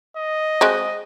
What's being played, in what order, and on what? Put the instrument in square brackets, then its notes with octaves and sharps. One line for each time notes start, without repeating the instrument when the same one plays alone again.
[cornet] D#5
[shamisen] G#3 C4 F#4